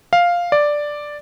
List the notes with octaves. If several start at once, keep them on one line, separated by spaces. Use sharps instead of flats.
F5
D5